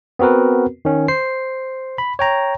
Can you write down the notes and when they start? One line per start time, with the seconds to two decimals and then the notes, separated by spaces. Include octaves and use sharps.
0.19 B3 C4 F#4 A#4 B4
0.85 D#3 C#4
1.08 C5 C7
1.98 B5
2.19 C#5 G5 A#5